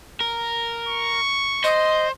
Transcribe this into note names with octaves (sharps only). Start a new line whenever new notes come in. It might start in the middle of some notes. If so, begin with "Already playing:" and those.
A#4
C#6
C5 D#5